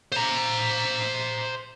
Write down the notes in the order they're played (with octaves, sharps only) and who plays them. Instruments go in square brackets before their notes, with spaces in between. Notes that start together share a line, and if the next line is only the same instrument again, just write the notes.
[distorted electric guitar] C5 A#5